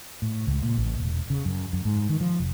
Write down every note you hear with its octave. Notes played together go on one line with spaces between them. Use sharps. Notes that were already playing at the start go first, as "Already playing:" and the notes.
A2
C#2
A#2
A1
E1
C#3
F#2
F#2
G#2
D#3
F3
F1